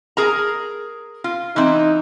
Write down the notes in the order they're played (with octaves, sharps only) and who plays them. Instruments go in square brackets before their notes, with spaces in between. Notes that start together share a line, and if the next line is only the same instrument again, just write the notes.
[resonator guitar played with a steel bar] G#4 A#4 A#5
F4
[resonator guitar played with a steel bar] E3 C4 [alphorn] D#4